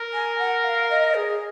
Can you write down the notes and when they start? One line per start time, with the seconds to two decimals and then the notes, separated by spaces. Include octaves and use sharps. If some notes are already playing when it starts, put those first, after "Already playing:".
Already playing: A#4
0.13 G#5
0.39 F#5
0.64 F5
0.90 D#5
1.15 G#4